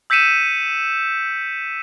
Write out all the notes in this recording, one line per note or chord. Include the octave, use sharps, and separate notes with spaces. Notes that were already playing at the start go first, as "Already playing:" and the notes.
E6 G6 B6 C#7 D#7 E7